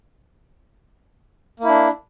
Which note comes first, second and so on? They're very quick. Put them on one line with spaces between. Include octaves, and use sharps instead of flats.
A#3 E4 D4